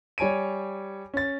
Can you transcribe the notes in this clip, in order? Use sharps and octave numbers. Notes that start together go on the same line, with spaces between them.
G3 C#5 G#5 D7 D#7
C#4 A6